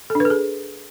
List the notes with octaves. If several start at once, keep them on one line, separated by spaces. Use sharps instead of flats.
A4
D4
B4
A4
G#4